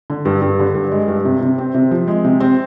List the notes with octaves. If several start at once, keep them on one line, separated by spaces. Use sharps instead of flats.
D3
G2
G2
D3
G2
G#3
G2
C3
C3
C4
C3
F3
G#3
C3
C4